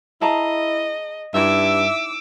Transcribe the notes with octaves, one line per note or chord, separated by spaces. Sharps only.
E4 G#4 D#5 A5 A#5
G2 D#4 E4 E5 D6 E6